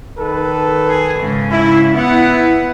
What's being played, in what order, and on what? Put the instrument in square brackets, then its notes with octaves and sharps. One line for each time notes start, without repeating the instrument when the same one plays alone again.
[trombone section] D#3 A4 B4
[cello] G#4
G#2 C#3
[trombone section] E4
[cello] B3 F#5 [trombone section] E4